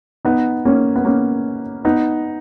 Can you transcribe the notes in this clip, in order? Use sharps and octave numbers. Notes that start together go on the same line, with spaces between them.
B3 D#4
A#3 C#4
B3
A#3 C#4
B3 D#4